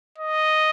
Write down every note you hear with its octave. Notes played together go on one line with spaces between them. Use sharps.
D#5